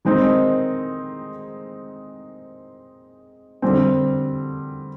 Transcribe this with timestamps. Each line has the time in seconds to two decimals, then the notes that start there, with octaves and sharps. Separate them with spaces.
0.05 D#3 G#3 C4 D#4
3.62 D3 G3 C4